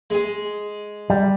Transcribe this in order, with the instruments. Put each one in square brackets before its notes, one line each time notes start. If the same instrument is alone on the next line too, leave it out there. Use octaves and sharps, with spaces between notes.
[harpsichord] G#3 G#4
[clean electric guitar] G3